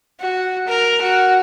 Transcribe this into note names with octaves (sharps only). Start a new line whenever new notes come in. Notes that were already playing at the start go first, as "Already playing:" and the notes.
F#4
A#4
F#4